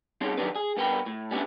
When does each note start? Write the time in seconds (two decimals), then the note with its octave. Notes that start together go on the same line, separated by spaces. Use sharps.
0.21 G3 C4 C#4 D#4 G#4
0.37 D#3 F#3 G3 C#4 D4 B4
0.56 G#4
0.77 G2 B3 A#4 G5 B5
1.06 A2
1.31 G3 G#3 B3 C#4 D4 E4